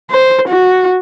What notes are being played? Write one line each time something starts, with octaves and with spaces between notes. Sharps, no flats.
C5
F#4